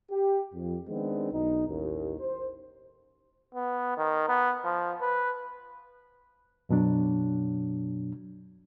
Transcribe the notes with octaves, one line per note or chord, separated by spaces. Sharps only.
G4
F2
D#3 G#3 B3 C4 D4
B1 D#4
A1 D#2
C5
B3
D#3
B3
F3
B4
F#2 B2 F#3 D4